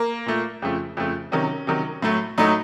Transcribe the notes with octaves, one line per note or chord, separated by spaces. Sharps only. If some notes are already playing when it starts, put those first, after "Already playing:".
Already playing: A#3
A#2 A3
F2 C#3 F3 A3
F2 C#3 F3 A3
C3 D#3 F#3 C#4
C3 D#3 F#3
A2 F#3 A3
A2 F#3 A3 D#4